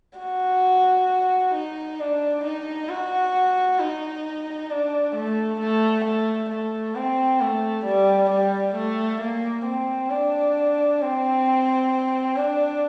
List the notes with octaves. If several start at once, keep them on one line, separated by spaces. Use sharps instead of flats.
F#4
D#4
D4
D#4
F#4
D#4
D4
A3
A3
A3
A3
C4
A3
G3
G3
A3
A#3
C4
D4
C4
D4